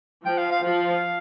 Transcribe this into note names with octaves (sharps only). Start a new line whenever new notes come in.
F3 G5
F5
F5
F3 F5